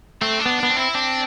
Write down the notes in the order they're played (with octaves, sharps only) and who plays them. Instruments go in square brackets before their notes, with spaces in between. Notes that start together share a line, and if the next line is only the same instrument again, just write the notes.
[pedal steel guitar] A3 [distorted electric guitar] C4
[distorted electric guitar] D4
[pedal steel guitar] B3
[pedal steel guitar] B3 [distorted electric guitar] D4
[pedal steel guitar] C4
[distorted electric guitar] E4
[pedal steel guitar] C4 [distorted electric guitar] D4